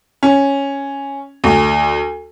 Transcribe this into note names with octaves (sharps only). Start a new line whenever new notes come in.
C#4
D2